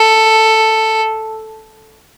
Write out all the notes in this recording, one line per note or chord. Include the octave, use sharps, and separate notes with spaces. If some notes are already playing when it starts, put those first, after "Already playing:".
Already playing: A4